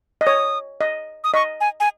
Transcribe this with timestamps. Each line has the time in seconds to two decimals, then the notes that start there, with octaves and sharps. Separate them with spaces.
0.21 D#5
0.26 C#5 D#6
0.81 D#5
1.24 D#6
1.34 D#5 C#6
1.61 G#5
1.80 G#5